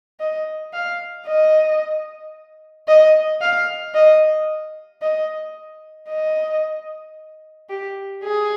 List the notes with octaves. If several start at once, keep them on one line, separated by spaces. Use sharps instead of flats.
D#5
F5
D#5
D#5
F5
D#5
D#5
D#5
G4
G#4